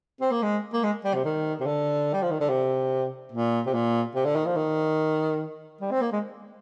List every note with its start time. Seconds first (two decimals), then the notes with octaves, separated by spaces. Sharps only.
0.21 C4
0.31 A#3
0.42 G#3
0.73 A#3
0.84 G#3
1.04 G3
1.14 C3
1.25 D#3
1.60 C3
1.66 D3
2.13 G3
2.22 F3
2.31 D#3
2.40 D3
2.49 C3
3.32 A#2
3.66 C3
3.74 A#2
4.15 C3
4.25 D3
4.36 D#3
4.46 F3
4.56 D#3
5.81 G3
5.91 C4
6.01 A#3
6.12 G#3